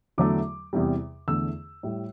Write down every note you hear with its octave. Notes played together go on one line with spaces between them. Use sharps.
E2 D3 F#3 A3 D6
E2 C3 G3
E2 D3 A3 E6
A2 G3